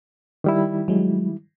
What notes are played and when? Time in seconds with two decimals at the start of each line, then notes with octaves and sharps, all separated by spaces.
0.44 D#3 G3 E4
0.88 F#3 G#3